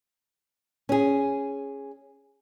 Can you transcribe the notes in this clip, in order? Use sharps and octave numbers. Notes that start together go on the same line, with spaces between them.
C#4 G#4